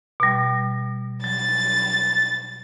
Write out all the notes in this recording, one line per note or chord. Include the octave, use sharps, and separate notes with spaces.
B2 G3
F#3 A6